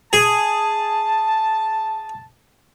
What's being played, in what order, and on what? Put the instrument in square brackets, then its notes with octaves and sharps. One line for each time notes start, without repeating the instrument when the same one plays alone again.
[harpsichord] G#4 [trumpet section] A5